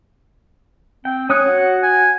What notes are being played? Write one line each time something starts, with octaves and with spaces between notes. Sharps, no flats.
C4 G5
C#4 C#5 D#6 F#6
F#4
G#5